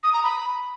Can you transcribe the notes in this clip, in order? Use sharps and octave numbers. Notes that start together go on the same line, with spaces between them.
D#6
A#5
B5